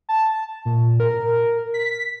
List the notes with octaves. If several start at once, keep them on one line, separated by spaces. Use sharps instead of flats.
A5
A#2
A#4
B6